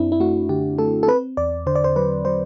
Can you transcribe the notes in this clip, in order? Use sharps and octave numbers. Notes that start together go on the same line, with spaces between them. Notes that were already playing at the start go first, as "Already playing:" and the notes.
Already playing: F#2 C4 D4 E4
E4
A3 F#4
D3 G4
A3 A4
A4
C4 B4
E2 D5
D3 C5
D5
C5
F#3 B4
F#3 C5